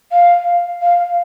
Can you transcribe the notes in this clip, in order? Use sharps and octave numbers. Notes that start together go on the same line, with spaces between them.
F5
F5